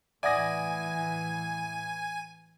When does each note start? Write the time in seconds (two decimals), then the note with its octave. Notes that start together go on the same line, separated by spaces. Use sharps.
0.23 A2 E3 D5 E5 F#5 G#5 D#6 A#6